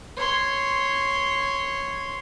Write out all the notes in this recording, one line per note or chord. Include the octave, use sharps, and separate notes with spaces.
C#5 C6